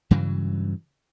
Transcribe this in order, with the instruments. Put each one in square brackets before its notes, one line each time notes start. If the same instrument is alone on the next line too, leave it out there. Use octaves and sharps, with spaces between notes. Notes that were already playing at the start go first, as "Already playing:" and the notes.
[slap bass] G2 C#3 E3 F#3